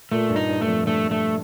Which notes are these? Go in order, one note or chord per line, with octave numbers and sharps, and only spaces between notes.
A#2 A3
G2
D#4
G2
A3
F2
G2 A3
G2 A3